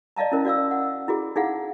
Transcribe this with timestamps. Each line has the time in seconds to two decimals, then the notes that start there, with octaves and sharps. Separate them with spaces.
0.17 D5 D#5 F5 A5 A#5
0.32 C#4 E4 A#4 C5
0.45 F#4 D5 F5 E6
0.71 F#5
1.08 E4 F#4 G#4
1.36 D#4 E4 G#4 F5 F#5